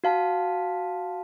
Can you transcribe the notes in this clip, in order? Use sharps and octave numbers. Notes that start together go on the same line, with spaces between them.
F#4 F5 A5